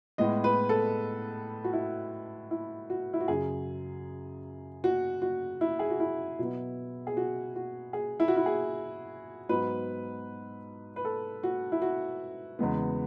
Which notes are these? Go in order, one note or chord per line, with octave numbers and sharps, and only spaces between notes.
A2 G#3 B3 D#5
B4
A4
F#4
E4
E4
F#4
E4
F#4
F#2 C#3 F#3 G#4
F#4
F#4
E4
G#4
F#4
E4
B2 F#3 B3
G#4
F#4
F#4
G#4
E4
F#4
E4
G#4
G#2 F#3 B3 B4
B4
A4
F#4
E4
F#4
E2 C#3 G#3 B3